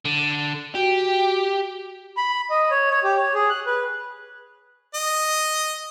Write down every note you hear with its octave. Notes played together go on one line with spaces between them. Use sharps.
D3
F#4 G4
B5
D#5
C#5
C#5
G4
C#5
G#4
F#6
B4
D#5